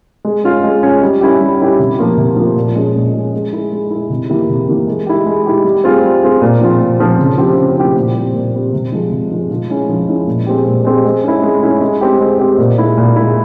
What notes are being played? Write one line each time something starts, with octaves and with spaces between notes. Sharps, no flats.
G#3
C#4 F4
G#3
C#4 F4
G3
C#4 E4 G4
G3
C#4 E4 G4
C3
F3 A#3 F4
C3
F3 A#3 F4
A#2
G#3 C#4
A#2
G#3 C#4
G#3
E4 G#4
G#3
E4 G#4
C3
E3 A#3 E4 G4
C3
E3 A#3 E4 G4
G#3
E4 G4
G#3
E4 G4
G3
C4 F4 G#4
G3
C4 F4 G#4
A#2
F3 C4 F4
A#2
F3 C4 F4
C#3
F3 C4 E4 G4
C#3
F3 C4 E4 G4
A#2
G3 C4
A#2
G3 C4
C3
F3 G#3
C3
F3 G#3
F3
G#3 C#4 E4
F3
G#3 C#4 E4
A#2
G#3 C4 G4
A#2
G#3 C4 G4
G#3
C#4 E4
G#3
C#4 E4
G#3
C4 G4
G#3
C4 G4
A#2
G#3 E4
A#2
G#3 E4